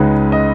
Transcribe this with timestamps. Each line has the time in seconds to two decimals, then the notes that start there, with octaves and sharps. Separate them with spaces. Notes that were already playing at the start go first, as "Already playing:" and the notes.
Already playing: C#2 C#3 G#3 D#4 B4
0.32 D#5